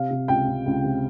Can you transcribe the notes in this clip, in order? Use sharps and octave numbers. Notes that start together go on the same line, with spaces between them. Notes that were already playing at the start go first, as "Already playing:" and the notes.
Already playing: C3 F5
C3
C#2 G5
C#2
C#2
C3